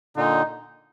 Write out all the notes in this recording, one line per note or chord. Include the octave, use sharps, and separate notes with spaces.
A#2 D3 D#4